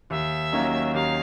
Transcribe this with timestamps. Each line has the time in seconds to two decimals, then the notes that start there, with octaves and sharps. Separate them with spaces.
0.10 D#2 E5
0.52 D#3 F#3 A#3 C#4
0.94 D#2 F5